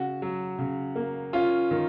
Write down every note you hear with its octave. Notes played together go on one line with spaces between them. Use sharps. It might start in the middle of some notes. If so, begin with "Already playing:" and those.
Already playing: C#3 F#4
F#3
C#3
A#3
C#4 F4
D#3